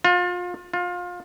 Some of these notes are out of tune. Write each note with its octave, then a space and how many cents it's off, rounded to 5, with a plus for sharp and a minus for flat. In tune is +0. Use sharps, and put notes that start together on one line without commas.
F4 +30
F4 +25